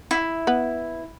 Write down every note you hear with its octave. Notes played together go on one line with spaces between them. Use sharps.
E4
B3